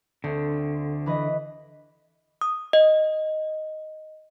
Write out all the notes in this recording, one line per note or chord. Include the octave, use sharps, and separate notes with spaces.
D2 D3 C4 C#7
E3 B4 D#5
D#6
D#5